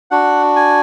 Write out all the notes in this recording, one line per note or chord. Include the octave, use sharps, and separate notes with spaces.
D4 F#4 F#5
G#5